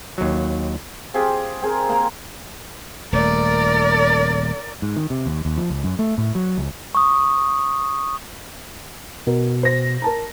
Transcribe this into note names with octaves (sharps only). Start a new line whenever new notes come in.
D#2 F#3
C4 F4 G4 G#4
C4 G#4 A#4
A#3 A#5 C6
D#1 A3 A#4 D5
G#2
D#3
C3
D#2
D#2
F3
C#2
F#2
A3
A2
F#3
C#2
C#6 D#6
B2 A#4
C5 A#6
A#4 A5 A#5